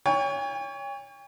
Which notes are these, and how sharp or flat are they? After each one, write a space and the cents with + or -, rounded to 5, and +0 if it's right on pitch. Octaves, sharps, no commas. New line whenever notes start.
C#5 +20 G5 +45